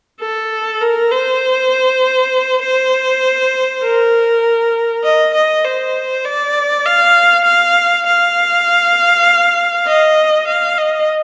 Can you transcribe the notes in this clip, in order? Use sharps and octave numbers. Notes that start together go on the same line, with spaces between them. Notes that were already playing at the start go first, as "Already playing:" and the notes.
A4
A#4
C5
C5
A#4
D#5
D#5
C5
D5
F5
F5
F5
D#5
F5
D#5